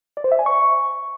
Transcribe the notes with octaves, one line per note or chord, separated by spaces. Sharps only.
D5
C5
E5
G#5
C#6